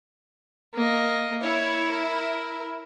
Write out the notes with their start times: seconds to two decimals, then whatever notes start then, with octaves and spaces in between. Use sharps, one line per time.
0.74 A#3 D#5
1.43 E4 C#5
1.91 A#4